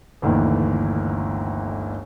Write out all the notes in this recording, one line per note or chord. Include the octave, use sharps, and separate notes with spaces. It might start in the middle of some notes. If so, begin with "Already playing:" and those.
G1 D2 A#2 D#3 E3